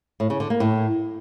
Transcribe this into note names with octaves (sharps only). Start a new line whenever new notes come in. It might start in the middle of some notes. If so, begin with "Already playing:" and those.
A2
C#3
D3
A#3
A2